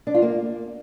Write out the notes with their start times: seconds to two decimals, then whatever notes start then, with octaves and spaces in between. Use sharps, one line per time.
0.07 D4
0.14 F4
0.22 A#3